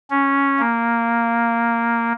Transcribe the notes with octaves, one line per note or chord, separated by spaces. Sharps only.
C#4
A#3